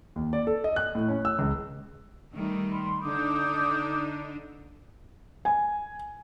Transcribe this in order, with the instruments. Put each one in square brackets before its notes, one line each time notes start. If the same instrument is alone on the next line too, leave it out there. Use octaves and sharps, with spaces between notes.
[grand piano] D#2
D5
A4
D#5
F#6
A2
C#4
E6
C#2
[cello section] D#3 G3 A3
[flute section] B5 C6
[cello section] D3 D4 D#4 [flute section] D6 D#6 G6
[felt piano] G#5